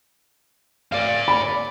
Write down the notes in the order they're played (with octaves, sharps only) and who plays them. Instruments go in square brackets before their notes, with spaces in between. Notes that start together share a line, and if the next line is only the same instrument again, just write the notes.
[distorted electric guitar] D5 F5
[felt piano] B5